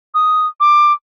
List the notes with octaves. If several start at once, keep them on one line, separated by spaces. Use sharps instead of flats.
D#6
D6